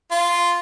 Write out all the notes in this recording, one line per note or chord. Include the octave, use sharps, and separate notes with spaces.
F4